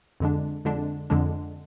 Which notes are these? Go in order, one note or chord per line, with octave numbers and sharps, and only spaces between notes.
F2 D3 G#3 D4
F2 D3 G#3 D4
F2 D3 G#3 D4